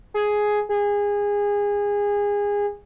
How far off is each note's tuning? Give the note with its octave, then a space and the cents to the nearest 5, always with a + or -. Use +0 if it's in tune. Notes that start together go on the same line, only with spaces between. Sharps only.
G#4 +5
G#4 -25